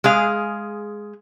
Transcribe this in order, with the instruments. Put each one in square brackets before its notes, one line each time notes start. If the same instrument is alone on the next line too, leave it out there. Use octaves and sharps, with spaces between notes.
[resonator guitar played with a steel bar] G#3 G#4 F5